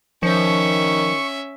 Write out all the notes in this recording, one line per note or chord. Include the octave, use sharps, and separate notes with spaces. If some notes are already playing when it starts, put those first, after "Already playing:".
D#3 F3 C#4 E5 C#6